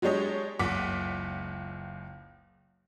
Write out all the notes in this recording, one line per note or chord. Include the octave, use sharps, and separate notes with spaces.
F#3 G#3 D4 G4 C#5 D#5
F#1 C#2 F#5 D6 B6